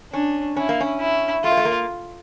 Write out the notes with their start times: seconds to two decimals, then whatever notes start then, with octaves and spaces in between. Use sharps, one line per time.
0.13 C#4 D4
0.56 C#4 E4
0.69 A#3
0.80 C#4
1.00 E4
1.44 A3 F4
1.51 A#3
1.57 A3
1.65 A#3